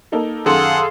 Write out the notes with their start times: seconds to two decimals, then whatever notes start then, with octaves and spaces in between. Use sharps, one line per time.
0.12 A#3 D#4 A4
0.46 F#2 D#3 G#4 A4 F5 F#5 C6